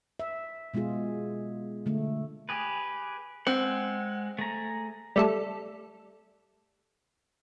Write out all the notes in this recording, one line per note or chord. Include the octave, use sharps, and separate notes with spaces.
E5
B2 G#3 B3 F4 G#4
D3 A3
G4 G#4 B4
G#3 C4 F#5
A3 G#4 A#5
G3 A3 A4